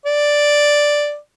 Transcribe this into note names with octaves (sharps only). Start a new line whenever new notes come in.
D5